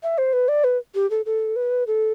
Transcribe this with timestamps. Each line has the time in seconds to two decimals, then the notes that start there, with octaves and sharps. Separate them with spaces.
0.03 E5
0.18 C5
0.33 B4
0.48 D5
0.64 B4
0.95 G4
1.10 A4
1.26 A4
1.56 B4
1.87 A4